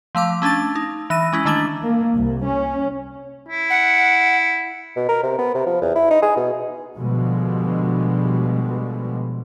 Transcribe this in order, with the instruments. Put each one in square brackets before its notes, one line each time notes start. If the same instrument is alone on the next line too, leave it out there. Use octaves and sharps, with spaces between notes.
[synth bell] F3 A3 F5 D6
A3 C#4 D4 A5 A6
D#4
E3 E6 A#6 D#7
G#3 C#4 E4
D#3 A3 D4 G#6 F#7
[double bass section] A#3
C2
C#4
[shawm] E4
[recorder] F#5
[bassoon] B2
A#4
C3
B3
C3
F3
E2
E4
D#4
G#4
B2
[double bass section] B2 D3 F3 G3 G#3